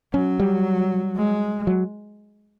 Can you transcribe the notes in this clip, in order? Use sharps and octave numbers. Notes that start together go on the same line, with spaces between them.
F#3 C#4
G3
G#3
F#3